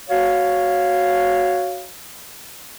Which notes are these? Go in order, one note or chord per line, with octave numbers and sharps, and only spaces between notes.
F#4 C#5 F5